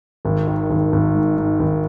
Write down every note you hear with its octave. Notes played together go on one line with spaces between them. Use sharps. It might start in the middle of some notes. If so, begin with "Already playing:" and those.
G#1
D#3
G#1
G#1
G#2
G#2
G#1